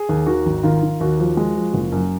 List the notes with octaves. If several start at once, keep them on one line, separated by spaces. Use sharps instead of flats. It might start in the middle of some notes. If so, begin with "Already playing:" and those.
Already playing: G#4
D#2
D#3 F#4
G#1
D#3 F4
D#3
D#2 F#4
F3
G#3
F3
F#1
F#2